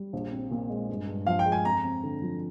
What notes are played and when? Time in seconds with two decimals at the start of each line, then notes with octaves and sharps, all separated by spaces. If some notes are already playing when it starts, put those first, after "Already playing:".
Already playing: G3
0.13 A#1
0.32 C4
0.51 A#2
0.70 G#3
0.89 G2
1.08 G2
1.27 F3 F5
1.39 G5
1.46 G#3
1.52 G#5
1.65 F2 A#5
1.84 C4
2.03 D3
2.22 F3